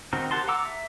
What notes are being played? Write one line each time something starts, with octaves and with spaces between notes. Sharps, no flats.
D#3 C4 F#4 A#4
G4 A#4 F#5 A5 C6
F#5 A#5 D6 E6
E5